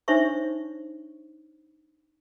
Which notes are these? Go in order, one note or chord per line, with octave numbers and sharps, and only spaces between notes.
D4 D#4 C5 C#5 E5 C#6